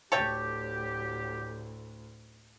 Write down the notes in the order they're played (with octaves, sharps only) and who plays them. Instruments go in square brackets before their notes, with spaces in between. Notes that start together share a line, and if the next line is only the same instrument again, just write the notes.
[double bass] D2 A2 [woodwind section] F#3 G4 [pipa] A4 C#5 G5